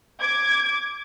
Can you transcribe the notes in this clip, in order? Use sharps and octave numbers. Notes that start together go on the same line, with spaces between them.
D6 G#6